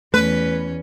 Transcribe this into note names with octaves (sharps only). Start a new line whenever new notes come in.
E2 A3 C#4 B4